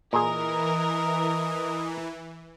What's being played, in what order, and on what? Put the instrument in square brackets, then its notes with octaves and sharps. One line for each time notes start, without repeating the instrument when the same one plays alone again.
[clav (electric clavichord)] A#2 G#4 [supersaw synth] E3 [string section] A#4 [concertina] D#5